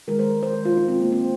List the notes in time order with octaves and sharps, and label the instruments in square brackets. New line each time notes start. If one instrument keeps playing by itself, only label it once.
[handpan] D#3 G#3 A#4
C5
C5
F4
D#4
C4
A#3
C4